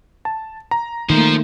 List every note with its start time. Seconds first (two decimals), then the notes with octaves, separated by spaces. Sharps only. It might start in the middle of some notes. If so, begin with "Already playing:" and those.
0.25 A5
0.71 A#5
1.10 D#3 F3 A3 A#3 C5